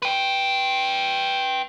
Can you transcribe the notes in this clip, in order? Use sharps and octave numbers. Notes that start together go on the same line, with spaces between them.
B4 G5